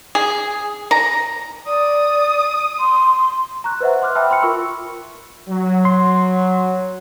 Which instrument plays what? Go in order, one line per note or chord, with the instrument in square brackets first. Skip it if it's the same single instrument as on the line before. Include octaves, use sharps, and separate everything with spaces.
[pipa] G#4
A#5
[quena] D5 [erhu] D#6
[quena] C6
[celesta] A#5 C#6 F#6
B4 C5 D#5 E5 F#5
C6 D6 F6 F#6
E5 G5 A5 B5 E6 F6
G5 B5 C6 F6 C#7
F4 A#4 B5 C#6 E6
[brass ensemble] F#3
[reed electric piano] C6